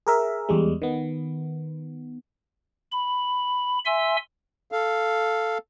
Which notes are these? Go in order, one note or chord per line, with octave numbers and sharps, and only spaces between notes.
G#4 A#4 E5
E2 G3 G#3
D#3 B3
B5
E5 G#5 C6 E6
A4 F5